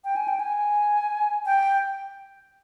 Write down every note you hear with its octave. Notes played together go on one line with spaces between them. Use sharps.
G5
G#5
G5
G#5
G5